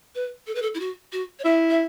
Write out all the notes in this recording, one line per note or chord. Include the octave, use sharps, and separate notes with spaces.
B4
A4
B4
A4
E4
F#4
F#4
C#5
E4 E5
E5